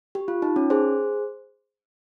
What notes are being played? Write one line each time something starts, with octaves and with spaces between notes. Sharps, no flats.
G4
F4
D#4
C#4
G#4 C5